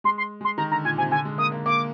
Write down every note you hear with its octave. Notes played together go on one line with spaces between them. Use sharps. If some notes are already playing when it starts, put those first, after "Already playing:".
G#3 C6
C6
G#3 C6
D#3 A#5
D3 A#5
A#2 G#5
C3 G#5
D3 G#5
G#3
A#3 D#6
A#3
A#3 D6